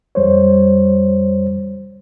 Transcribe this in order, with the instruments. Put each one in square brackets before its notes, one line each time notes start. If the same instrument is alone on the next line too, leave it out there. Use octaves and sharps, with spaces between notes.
[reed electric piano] F2 G3 C5 C#5